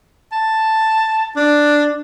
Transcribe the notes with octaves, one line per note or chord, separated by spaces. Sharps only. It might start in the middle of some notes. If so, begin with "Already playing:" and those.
A5
D4